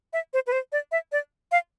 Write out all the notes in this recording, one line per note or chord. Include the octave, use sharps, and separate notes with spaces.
E5
C5
B4
C5
D5
E5
D5
F5